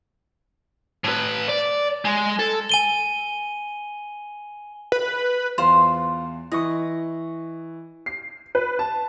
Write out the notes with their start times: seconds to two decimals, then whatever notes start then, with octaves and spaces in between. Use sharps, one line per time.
1.04 A2 B4
1.49 D5
2.05 G#3
2.39 A4
2.69 G#5 D#7 G7
4.92 B4
5.58 E2 F4 C5 C6
6.52 E3 D#5 C#6
8.06 C7
8.55 B4
8.79 A5